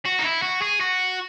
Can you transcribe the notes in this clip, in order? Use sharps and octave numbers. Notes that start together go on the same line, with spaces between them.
F#4
D#4
E4
F#4
G#4
F#4